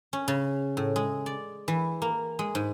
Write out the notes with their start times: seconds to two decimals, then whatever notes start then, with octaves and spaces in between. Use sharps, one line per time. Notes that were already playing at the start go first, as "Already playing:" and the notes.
0.13 C#4
0.28 C#3
0.77 A2
0.96 G#3
1.26 D5
1.68 E3
2.02 A#3
2.39 G#3
2.55 G#2